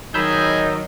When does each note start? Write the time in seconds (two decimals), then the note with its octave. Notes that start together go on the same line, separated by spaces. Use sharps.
0.14 D#3 F#3 G#4 D#5 B5 E6 G6